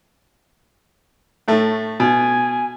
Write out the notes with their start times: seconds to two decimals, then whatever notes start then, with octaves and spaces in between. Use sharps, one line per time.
1.48 A2 A3
2.00 B2 G#5